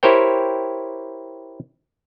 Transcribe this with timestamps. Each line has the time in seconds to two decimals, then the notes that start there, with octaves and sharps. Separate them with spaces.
0.03 E4 G4 A#4 C5 C#5 G5